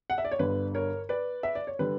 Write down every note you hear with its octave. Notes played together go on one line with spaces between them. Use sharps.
F#5
E5
D5
C#5
G1 G2 D3 B4
A#4 C#5
B4 D5
E5
D5
C#5
D3 G3 B4